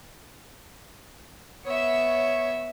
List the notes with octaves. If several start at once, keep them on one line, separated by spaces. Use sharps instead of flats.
B3 C#5 E5